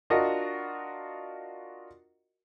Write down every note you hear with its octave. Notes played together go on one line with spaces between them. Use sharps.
D4 F4 F#4 A#4 D#5